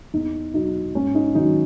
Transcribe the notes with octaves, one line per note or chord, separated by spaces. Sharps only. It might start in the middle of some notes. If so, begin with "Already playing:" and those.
E2 D#4
B2 F#3 D#4
G#2 C#4
D#4
D#3 F#3 D#4